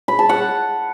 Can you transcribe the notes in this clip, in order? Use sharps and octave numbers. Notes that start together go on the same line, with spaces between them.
B5
A5
F#5